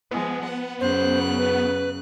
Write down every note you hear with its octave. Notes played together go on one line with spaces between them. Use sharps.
F3 G#3 B3
F#5
F#2 C#3 C5 F#6
B4